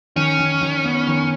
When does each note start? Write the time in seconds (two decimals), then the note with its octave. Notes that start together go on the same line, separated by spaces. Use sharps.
0.16 D#3 C#4
0.39 D#3
0.61 D#3
0.85 B3
1.07 D#3